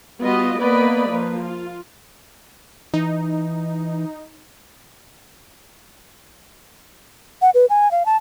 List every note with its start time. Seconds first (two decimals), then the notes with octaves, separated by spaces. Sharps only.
0.21 G3 B3 F4 F#4 D#5
0.59 A#3 B3 B4 D5 D#5 B5
1.08 F3 A#3 B4
1.40 F4
2.93 E3 D#4
7.42 F#5
7.54 B4
7.70 G#5
7.91 F5
8.06 A5